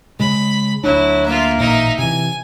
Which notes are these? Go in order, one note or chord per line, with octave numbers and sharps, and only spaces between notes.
C#3 G#3 B5
D2 F#3 D4 E4
A#3 F4 E5
A1 A#2 D#4 E5
C3 E3 G#5